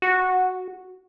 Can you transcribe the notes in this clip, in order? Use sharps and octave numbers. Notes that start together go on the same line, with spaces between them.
F#4